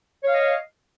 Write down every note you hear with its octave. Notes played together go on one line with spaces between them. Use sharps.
C#5 D#5 F5